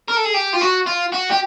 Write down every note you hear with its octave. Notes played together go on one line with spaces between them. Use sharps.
A#4
A4
G#4
G4
F4
F#4
F4
F#4
G4